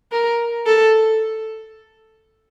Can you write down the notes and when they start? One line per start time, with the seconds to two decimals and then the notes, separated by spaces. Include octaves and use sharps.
0.12 A#4
0.66 A4